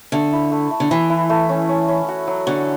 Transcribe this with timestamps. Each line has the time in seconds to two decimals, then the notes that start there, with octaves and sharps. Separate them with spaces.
0.12 D3 A3
0.33 E4
0.51 A3
0.71 A3
0.80 D3
0.90 E3 E4
1.10 E4
1.29 A3
1.49 C#4
1.69 C#4
1.88 C#4
2.08 F#4
2.27 F#3
2.47 D3 F#4